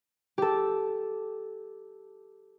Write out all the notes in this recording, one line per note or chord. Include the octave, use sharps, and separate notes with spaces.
G4 A4